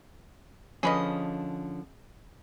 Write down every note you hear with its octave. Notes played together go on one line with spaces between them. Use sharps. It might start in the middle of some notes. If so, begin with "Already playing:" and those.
D3 F3 C#4 G#4 B4 D#5